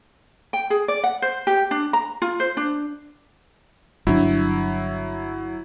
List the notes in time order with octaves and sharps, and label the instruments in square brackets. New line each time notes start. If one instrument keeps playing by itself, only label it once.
[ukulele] G5
G#4
D5
F#5
C5
G4
D4
A#5
F4
C5
D4
[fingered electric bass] G1 D4 [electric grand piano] F#3 E4